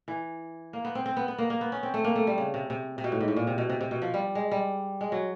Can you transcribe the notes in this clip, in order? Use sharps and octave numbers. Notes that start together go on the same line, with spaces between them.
E3
A#3
B3
C4
C4
B3
B3
A#3
A#3
B3
C#4
C4
A3
A#3
A3
G3
C#3
C3
C3
C3
B2
A2
G#2
A2
A#2
C3
B2
C3
C3
B2
F3
G3
G#3
G3
G#3
F#3